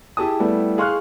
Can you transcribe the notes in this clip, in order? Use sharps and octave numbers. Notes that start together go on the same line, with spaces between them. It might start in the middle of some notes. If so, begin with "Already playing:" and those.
E4 G4 G#4 A5 D#6
G3 A3 B3 E4
G#4 F5 C6 C#6 F6 F#6